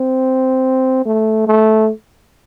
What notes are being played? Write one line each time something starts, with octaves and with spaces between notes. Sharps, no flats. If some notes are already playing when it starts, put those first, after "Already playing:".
Already playing: C4
A3
A3